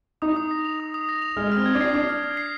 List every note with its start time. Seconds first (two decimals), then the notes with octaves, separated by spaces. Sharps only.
0.22 D#4 D#6
0.36 D#6
0.51 A#6
0.65 F7
0.80 D#6
0.94 D#6
1.09 A#6
1.22 F7
1.37 G#3 F6
1.52 C4 F6
1.66 G#6
1.75 D4
1.81 C7
1.94 D4 F6
2.09 F6
2.24 G#6
2.37 C7